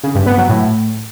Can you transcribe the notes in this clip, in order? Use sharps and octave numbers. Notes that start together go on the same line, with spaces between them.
C#3
G2
B3
F#3
A2